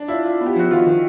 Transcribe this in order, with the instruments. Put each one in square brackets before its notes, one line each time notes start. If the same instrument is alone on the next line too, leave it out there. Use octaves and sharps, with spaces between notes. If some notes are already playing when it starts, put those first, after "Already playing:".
Already playing: [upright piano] D4
[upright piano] E4 [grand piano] F4
[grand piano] F4
B3
[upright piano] G4
[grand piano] F3 [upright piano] F#4
[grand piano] D#3 [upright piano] F4
[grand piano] D#3